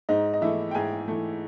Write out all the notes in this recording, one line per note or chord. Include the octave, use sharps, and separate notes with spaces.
G#2 D#4 D#5
D#5
E3 A3 E4 E5
G5
G#2 G#4 G#5
E3 A3